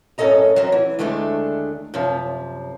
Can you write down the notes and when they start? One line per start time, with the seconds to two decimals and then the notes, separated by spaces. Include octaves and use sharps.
0.18 F#2 A2 C#4 A4 D#5 A#5
0.56 F#3 C4 C#4
0.72 E3
0.99 D2 D#3 G#3 A3 D4
1.94 F#2 C3 F3